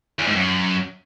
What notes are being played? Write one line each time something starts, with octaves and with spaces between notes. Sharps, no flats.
E2
G#2
F#2